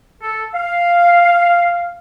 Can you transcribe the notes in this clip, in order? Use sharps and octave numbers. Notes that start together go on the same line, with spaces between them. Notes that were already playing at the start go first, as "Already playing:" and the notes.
A4
F5